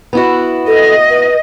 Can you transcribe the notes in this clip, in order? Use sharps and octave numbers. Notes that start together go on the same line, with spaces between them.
B3 E4 F#4
A4 D#5
B4